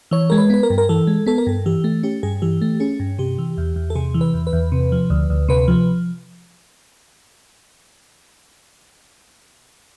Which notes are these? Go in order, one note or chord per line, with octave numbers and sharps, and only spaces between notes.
E3 C#5
G#3 A#4
B4
B3 B4
A#4
G2
A#4
E3 A4
G#3
B3 A4
A#4
G2 A4
E3 G4
A3
C#4 G4
G2 G#4
E3 G4
A3
C#4 G#4
G2
C3 G4
E3
E2
E2
A4
C3 G#4
E3
B4
E2
B4
E2
C3
F3
D2
D2
C3 B4
F3